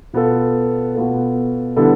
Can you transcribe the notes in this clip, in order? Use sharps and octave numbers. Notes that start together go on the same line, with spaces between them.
B2 B3 F4 A4
B2 B3 F4 A4
D3 G3 B3 E4 A4